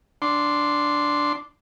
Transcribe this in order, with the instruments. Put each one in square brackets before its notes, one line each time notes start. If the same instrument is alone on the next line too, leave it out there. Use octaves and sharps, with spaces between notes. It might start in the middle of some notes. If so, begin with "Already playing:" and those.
[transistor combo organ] D4 C6